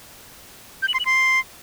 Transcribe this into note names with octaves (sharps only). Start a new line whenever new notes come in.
G6
F#7
C6
F#7
C6